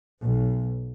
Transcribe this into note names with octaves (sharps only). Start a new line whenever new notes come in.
B1